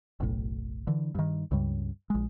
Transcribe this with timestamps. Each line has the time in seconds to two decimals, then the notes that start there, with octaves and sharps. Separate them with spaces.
0.20 F#1 B1 A2
0.87 D3 E3
1.15 G2 D#3
1.51 C#2 G2 C#3 G3
2.10 A#1 G#3